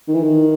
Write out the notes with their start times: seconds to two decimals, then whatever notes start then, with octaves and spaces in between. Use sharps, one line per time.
0.08 D#3
0.15 E3
0.23 D#3